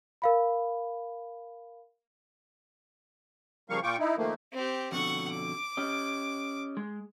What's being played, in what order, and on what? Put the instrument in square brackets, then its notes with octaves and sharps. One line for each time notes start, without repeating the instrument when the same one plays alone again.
[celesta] A#4 F5 B5
[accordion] C#3 F3 G3 A#3 F5 C#6
A#2 F4 G5 C#6 D6
D#4 E4
D#3 F3 A3 A#3
[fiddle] C4 G4
[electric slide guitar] F2 B2 D3 [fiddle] F#5 C#6
[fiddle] D6
[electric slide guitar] C#4 G4 D#5
G#3